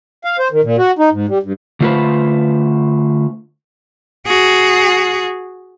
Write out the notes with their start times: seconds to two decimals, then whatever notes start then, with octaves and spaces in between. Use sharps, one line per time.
0.25 F5
0.39 C5
0.52 D#3
0.64 A#2
0.79 F#4
0.99 D#4
1.12 G#2
1.29 G3
1.43 G2
1.80 D3 A3 F4 A4 B4 C5
4.27 F#4 G#4